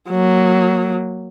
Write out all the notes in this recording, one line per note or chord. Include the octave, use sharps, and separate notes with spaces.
F#3 A#3